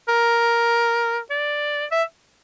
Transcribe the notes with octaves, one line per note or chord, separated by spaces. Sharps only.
A#4
D5
E5